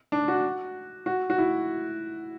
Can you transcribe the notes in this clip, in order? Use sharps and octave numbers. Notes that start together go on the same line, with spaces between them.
D4
F#4
F#4
F#4
E4